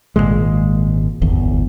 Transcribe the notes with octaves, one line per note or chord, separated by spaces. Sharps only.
G#1 D#2 A#2 G#3
D1 G1 E2